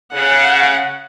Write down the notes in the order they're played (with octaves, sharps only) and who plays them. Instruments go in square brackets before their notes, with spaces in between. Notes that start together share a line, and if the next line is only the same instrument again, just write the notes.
[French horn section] C#3 [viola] F#5